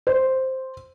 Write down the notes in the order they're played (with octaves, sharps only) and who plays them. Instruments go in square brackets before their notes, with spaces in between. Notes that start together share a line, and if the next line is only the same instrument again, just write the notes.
[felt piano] C5